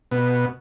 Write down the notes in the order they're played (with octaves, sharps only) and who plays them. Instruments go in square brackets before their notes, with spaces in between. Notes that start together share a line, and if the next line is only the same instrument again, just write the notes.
[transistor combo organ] B2